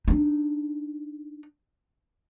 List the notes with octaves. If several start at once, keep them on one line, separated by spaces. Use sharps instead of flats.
D4 D#4